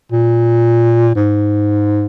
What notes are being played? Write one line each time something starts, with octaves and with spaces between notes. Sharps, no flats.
A#2
G#2